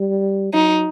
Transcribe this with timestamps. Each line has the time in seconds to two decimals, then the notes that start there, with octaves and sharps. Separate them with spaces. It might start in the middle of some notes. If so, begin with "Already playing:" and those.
Already playing: G3
0.54 F#3 D#4